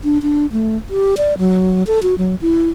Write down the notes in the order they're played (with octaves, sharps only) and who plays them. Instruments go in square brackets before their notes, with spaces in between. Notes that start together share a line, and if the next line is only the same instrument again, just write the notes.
[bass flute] D4
D4
A3
G4
D5
F#3
A4
F#4
F#3
E4